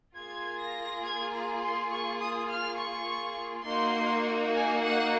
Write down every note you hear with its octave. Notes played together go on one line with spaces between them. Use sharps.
A#3 F4 G#4 G#6
A#6
G#6
A#5
C6
C#6
D#6
F6
C#6
A#3 D#4 F#4 C6
G#5
F#5